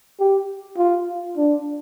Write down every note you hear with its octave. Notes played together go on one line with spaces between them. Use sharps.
G4
F4
D4